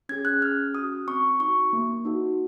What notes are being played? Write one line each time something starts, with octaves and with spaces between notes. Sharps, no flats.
C#4 G#4 G#6
F#6
C#4 F6
F#4 D#6
C4 C#6
D#4 F#4 C#6
A#3
D#4 F#4